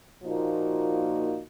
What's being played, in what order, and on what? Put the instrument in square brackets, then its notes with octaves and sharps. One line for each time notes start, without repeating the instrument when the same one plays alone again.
[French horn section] A#2 F3 A#3 D#4 F#4